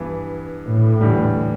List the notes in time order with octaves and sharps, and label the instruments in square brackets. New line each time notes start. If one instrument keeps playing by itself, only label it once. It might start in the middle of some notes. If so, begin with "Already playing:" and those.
Already playing: [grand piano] G2 E3 B3
[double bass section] A2
[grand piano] E2 D3 G3